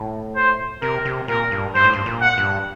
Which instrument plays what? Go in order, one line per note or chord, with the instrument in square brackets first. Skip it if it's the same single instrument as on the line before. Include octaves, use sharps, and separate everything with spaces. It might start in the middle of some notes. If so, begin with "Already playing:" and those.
Already playing: [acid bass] A2
[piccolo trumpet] C5
[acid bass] C3 [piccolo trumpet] A#4
[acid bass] C3
[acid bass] A#2 [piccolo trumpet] A#4
[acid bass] G2
[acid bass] G2 [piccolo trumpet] C5
[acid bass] A2
G2
A#2
[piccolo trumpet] F#5
[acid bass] G2